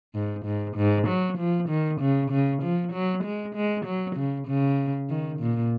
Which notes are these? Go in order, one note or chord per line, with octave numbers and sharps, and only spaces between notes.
G#2
G#2
G#2
F#3
F3
D#3
C#3
C#3
F3
F#3
G#3
G#3
F#3
C#3
C#3
D#3
A#2